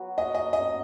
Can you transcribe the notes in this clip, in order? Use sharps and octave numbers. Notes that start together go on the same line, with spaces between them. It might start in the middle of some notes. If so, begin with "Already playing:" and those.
Already playing: F#3 B3 F#4
D#5
D#5
D#5